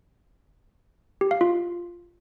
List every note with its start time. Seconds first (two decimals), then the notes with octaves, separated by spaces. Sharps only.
1.21 G4
1.31 F5
1.41 F4